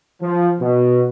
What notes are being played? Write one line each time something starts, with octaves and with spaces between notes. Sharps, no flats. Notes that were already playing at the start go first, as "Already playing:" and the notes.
F3
B2